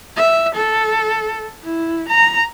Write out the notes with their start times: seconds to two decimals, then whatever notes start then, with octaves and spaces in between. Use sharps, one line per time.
0.17 E5
0.55 A4
1.64 E4
2.09 A#5